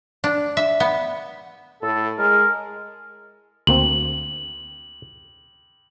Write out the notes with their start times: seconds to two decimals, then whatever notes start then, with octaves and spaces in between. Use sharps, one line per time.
0.24 D4
0.57 E5
0.80 B3
1.82 A2 A4
2.19 G#3 A#4
3.67 D2 A#3 C4 F#7